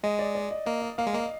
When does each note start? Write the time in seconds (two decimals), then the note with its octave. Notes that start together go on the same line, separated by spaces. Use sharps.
0.03 G#3 D#5
0.19 D5
0.35 D5
0.51 D#5
0.66 A#3 D#5
0.82 D#5
0.98 A#3 F5
1.07 G#3
1.13 A#3 D#5